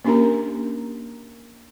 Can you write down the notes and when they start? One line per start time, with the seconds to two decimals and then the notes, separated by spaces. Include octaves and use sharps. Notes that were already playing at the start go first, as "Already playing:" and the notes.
0.05 A#3 C#4 D4 G4 A#4 A#5